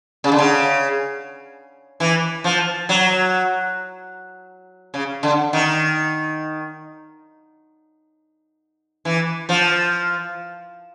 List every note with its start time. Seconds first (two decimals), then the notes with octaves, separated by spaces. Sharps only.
0.24 C#3
0.32 D3
0.38 C#3
2.00 E3
2.44 F3
2.89 F#3
4.94 C#3
5.23 D3
5.53 D#3
9.05 E3
9.49 F3